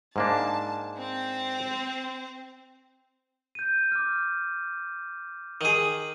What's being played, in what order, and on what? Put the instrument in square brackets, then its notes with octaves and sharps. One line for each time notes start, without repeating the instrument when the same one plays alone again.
[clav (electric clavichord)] G#2 A#3 D4 [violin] A5
[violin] C4 C5
[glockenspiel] G6 D#7
D6 F6
[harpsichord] D#3 G#4 [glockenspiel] F#7